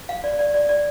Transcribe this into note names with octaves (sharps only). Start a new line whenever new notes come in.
F5
D5
D5
D5
D5